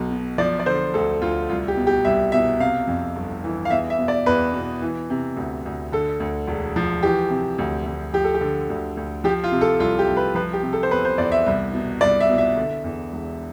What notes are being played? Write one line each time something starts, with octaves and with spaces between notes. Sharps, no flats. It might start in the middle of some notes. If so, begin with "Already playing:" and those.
Already playing: B1 B2
B2
F3 D5
D5
D3 C5
D2 A4
D2 F4
C2 F4
G4
B2
G4
C2 E5
B2 E5
C3 F5
F2
G1
E3
F5
E2 E5
E5
B2
D5
E2 B4
B2
E3
C3
D2
D2
D3 A4
D2
E1
F3
E3 G4
C3
D2
D2
F3 G4
A4
G4
D3
D2
D2
F3 G4
F4
C3
A4
C2 F4
G4
C2
B4
F3 B4
G4
C3
A4
C5
E2 B4
C5
E2 D5
E5
C2
B2
C2 D5
E5
B2
E5
D3
E2
E1